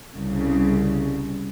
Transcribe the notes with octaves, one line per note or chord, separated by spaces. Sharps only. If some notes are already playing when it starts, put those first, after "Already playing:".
C2 C#3